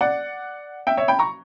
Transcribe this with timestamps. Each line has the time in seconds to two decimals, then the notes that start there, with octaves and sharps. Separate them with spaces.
0.01 D5 F#5
0.87 E5 G5
0.97 C#5 E5
1.08 G5 B5
1.19 A#5 C#6